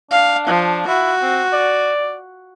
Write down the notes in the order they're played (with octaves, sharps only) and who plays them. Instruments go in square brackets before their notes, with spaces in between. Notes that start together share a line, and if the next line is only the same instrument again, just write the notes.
[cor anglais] D4 [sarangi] F5
[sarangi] F3
[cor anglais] E4 [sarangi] F#4
[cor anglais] C4
D5